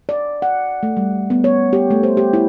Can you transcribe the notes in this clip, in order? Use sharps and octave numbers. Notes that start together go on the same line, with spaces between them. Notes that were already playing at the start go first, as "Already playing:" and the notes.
D5
F#5
A3
G3
B3
C#5
G4
A3
C5
G4
E4